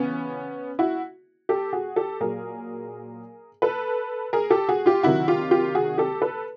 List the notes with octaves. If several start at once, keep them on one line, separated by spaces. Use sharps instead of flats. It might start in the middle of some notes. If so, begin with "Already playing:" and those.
Already playing: C#3 E3 B3 C#4
E4 F#4
G4 A4
F#4 G#4
G4 A4
A#2 F#3 G#4 A#4
A4 B4
G#4 A#4
G4 A4
F#4 G#4
F4 G4
C3 D#3 F#3 E4 F#4
F4 G4
F4 G4
F#4 G#4
G4 A4
A4 B4